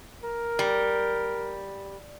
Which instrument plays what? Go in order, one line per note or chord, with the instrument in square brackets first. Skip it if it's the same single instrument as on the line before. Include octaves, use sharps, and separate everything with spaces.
[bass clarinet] A#4
[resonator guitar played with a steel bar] G3